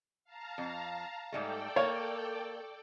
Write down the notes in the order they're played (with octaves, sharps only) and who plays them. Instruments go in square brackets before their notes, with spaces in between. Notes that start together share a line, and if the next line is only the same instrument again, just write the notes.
[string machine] F5 A5 A#5
[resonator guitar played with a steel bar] F2
[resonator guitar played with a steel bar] G#2 G3 A3 [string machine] A4 D5 G5
[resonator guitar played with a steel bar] A#3 [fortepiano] C#5